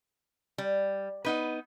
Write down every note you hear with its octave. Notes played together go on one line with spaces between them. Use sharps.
G3
B3 D#4 B4